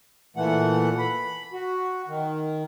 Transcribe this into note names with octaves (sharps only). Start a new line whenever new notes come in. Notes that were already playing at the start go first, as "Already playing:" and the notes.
A#2 E3 A3 F#5
B5
F#4
D#3